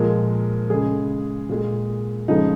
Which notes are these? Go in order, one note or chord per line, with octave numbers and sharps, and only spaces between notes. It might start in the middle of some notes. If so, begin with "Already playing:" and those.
Already playing: A#2 F3 G#3 A#4
C#3 G#3 G#4
A#2 G#3
C#3 F3 G#3 D#4